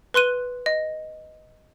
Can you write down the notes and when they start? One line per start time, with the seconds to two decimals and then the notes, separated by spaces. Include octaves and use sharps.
0.14 B4 C6 F#6 D#7 G7
0.66 D#5